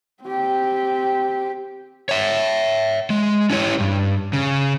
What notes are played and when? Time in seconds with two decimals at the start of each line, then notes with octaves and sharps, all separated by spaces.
0.24 C4 G4
2.09 C#5 E5
3.10 G#3
3.50 C#4 D4 E4 G4 C#5
3.80 G2
4.33 C#3